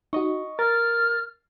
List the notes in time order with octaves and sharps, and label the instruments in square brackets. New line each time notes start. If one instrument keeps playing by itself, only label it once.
[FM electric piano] D#4 F#4 [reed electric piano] D#5 C#6
[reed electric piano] A#4 [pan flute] F6 [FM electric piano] A6